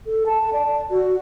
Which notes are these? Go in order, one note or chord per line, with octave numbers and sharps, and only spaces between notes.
A4
A5
D5
F#4